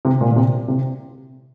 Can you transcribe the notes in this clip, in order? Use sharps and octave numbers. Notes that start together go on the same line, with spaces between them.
C3
A#2
A#2
C3
C3